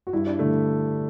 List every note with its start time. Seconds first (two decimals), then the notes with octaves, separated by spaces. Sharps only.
0.07 F#4
0.13 G2 E4
0.27 D4
0.39 D3 A3